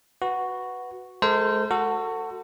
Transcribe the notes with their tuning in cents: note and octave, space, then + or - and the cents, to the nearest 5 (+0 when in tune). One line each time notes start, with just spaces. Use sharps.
F#4 +0 B4 +0
G#3 +35 A4 +45 C5 -20
F#4 +0 A4 +30